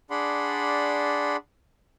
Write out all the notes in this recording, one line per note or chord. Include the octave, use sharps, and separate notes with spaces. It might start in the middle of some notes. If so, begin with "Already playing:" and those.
D4 G#4 D5 F#5 B5 C6